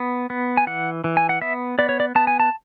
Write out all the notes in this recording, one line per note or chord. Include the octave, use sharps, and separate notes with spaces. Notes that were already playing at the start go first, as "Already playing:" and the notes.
Already playing: B3
B3
G#5
E3 F#5
E3
G#5
F#5
B3 E5
B3 D5
C#5
D5
B3 A5
G#5
A5